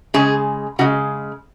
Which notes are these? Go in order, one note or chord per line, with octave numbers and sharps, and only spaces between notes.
C#3 G#3 G#4
C#3 G#3 F#4